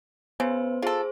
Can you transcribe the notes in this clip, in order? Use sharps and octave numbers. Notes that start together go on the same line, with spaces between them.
C#3 B3 B4 C5
F4 G#4 A4 C5